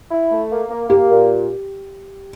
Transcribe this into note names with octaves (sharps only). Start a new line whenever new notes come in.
E4
A3
A#3
A#3
A#3 G4
A#2